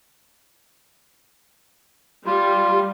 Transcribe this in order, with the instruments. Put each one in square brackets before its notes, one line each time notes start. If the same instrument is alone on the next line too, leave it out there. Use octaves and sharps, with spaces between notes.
[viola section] G3 [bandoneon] F4